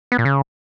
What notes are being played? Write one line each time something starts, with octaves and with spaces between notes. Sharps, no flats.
B3
A#2
C#3